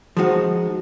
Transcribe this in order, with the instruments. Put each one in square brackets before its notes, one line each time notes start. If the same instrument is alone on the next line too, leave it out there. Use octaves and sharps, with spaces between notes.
[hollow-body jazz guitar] F3 G#3 B3 D#4 F#4